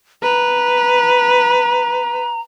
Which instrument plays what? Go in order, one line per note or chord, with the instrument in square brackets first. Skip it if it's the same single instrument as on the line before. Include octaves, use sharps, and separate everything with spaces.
[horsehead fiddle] B4 [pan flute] A#5